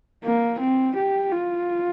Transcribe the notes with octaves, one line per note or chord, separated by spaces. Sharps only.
A#3
C4
G4
F4